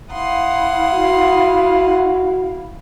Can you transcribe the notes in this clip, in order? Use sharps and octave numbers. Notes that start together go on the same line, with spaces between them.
E4 F5 F#5 C6 D#6
F#4